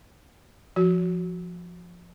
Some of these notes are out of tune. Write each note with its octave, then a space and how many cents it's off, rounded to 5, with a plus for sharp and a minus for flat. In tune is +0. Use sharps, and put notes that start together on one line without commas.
F3 +0 F#4 +0